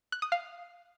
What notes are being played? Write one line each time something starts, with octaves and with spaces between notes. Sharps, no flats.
F#6
D#6
F5